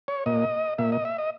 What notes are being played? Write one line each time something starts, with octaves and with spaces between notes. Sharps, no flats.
C#5
A#2 D#5
A#2 E5
D#5
E5
D#5